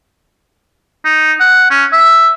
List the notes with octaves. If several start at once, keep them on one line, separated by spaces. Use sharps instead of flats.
D#4
F#5
C#4
E5